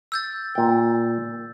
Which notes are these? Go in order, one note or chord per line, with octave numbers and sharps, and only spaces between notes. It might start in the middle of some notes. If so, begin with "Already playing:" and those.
E6 G6 A6
A#2 G5